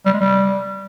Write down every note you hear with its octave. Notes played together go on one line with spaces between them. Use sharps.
G3
G#3
G3